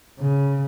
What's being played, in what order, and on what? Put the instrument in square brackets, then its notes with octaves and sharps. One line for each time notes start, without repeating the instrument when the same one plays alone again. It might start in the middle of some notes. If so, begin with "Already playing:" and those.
[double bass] C#3